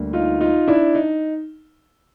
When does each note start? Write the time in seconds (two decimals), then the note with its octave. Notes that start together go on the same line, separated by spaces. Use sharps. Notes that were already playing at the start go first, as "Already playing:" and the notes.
Already playing: D2 D3 G3 A#3
0.13 D#4 F4
0.41 D#4 F4
0.68 D4 E4
0.95 D#4